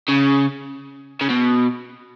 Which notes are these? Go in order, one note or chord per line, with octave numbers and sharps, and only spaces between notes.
C#3
C#3
B2